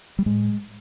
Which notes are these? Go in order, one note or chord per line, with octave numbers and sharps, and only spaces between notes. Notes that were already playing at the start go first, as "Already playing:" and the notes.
G3
A2 G#3